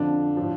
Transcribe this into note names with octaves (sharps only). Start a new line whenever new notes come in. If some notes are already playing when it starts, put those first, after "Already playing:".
Already playing: F2 D3 F3 D4
A2 F3